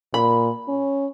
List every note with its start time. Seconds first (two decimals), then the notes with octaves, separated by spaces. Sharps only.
0.14 A#2 B5
0.69 C#4